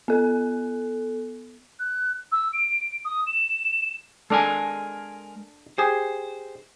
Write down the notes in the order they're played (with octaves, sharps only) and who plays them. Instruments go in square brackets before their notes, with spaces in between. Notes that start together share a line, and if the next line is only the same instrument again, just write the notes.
[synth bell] B3 A4
[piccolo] F#6
E6
D7
D#6
E7
[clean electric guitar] G#3 A#4 G#5 [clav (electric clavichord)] D4 A4
[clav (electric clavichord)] G4 G#4 [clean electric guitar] C5